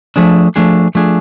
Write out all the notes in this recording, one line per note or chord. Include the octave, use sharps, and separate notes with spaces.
F3 A3 D4 G#4
F3 A3 D4 G#4
F3 A3 D4 G#4